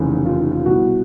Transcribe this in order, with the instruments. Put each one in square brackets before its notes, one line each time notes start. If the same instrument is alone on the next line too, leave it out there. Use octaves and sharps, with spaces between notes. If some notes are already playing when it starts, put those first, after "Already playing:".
Already playing: [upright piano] F1 D#2 C#3 E3
F4
F4
C2 B2 F#4